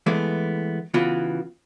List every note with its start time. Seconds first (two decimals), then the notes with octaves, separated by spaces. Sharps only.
0.06 E3 G#3 A3 B3
0.94 C#3 E3 B3 F4 F#4